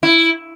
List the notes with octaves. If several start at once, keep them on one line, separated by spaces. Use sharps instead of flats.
E4